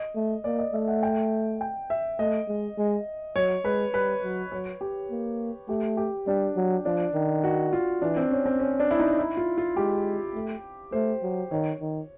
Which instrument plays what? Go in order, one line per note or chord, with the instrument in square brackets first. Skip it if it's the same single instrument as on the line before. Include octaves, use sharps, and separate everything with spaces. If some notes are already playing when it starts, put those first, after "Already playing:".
Already playing: [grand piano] D#5
[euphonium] A3
[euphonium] A#3 [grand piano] D5
[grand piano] D#5
[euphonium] A3 [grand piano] E5
[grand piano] F#5
G5
G5
E5
[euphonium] A3 [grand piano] D#5
[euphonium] G#3
G#3
[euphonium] F#3 [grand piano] C#5
[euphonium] G#3 [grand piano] B4
[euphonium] G3 [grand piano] B4
[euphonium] F#3
[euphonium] F#3 [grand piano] C#5
[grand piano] G4
[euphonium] A#3
[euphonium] A3 [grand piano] G4
[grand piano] G4
[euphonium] G3 [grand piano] D4
[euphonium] F#3
[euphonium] F3 [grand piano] D4
[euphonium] D#3
[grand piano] F#4
F4
[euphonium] E3 [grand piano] D4
[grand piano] C4
C#4
C4
C#4
D4
E4
D#4
E4
F4
F4
[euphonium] G#3 [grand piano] G4
[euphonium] A3
[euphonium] A3 [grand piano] C5
[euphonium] F#3
[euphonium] D#3 [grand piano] C#5
[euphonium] D#3